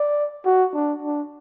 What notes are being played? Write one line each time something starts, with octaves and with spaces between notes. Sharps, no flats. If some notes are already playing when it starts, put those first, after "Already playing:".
Already playing: D5
F#4
D4
D4